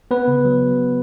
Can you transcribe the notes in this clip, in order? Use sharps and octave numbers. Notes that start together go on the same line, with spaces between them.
B3 B4
C#3
F#3